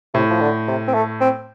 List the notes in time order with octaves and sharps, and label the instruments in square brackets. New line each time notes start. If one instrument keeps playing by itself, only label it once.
[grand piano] A2 [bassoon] C3
[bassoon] F3
D3
C3
C4
A3
C4